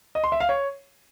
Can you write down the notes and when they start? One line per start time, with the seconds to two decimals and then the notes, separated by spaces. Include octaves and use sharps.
0.15 D#5
0.24 C6
0.32 E5
0.40 F5
0.49 C#5